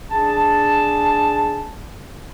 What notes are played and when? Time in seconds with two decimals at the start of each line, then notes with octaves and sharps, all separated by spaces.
0.11 D4 G#4 A5